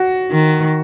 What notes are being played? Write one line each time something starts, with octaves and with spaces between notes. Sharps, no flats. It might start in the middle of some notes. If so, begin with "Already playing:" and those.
Already playing: F#4
D#3